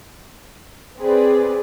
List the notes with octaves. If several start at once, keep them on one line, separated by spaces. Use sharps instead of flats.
C4 G#4 B4 D5